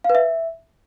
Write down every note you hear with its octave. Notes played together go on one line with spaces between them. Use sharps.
F5
B4
E5